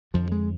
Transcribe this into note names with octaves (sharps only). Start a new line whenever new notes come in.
F2 D3 F3
G#3